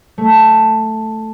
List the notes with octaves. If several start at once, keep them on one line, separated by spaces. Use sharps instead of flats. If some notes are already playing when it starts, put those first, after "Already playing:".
A3